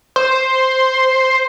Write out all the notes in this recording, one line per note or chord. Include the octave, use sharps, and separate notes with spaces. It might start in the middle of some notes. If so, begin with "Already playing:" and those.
C5